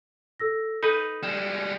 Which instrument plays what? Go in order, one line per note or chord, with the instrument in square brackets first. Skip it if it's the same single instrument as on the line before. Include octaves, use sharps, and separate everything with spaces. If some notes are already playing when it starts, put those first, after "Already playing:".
[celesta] A4 E6 A#6
[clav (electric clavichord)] D#4 B4 [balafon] A4 [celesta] B5
[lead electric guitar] G3 G#3 [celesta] E7